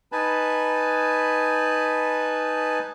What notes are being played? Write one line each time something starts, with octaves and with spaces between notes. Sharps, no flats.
D#4 B4 G#5 A5 B5